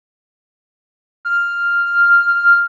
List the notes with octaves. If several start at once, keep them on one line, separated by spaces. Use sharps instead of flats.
F6